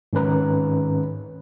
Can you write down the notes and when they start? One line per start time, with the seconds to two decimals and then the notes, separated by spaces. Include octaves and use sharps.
0.13 G#2 D#3 C#4 B4 A#5